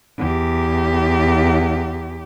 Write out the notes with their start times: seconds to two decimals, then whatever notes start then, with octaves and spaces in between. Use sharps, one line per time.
0.18 E2 G4